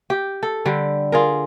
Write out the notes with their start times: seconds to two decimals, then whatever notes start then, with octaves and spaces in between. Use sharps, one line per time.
0.10 G4
0.43 A4
0.66 D3 G3
1.12 F4 G#4 A#4